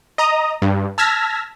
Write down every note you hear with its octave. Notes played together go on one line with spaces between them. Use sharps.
D#5 A#5 D#6
G2
A5 E6 F6 G#6 A#6 B6